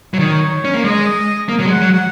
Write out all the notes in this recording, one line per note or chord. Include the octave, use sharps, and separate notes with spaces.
F#3
D#3 C#5
C#4
A#3
G#3 D#5
A#3
F#3
G#3
F#5
F#3
F#5